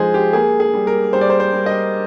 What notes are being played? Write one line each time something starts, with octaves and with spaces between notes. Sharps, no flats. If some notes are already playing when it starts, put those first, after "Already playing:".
Already playing: F3 G#3 D#4 G#4 C5
G4
A#3 G#4
G#4
G3
A#4
G3 C5
D5
C5
C5
G3
D#5